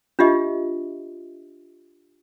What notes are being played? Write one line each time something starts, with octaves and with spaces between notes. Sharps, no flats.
D4 F4 G4 D#5 E5